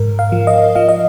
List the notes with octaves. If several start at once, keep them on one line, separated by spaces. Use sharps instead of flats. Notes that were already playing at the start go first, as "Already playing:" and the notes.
Already playing: G#2 A#4
F5
F3
D#5
F3 F5
D#5